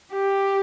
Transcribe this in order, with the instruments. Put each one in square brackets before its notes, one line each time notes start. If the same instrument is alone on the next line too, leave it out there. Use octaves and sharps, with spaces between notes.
[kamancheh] G4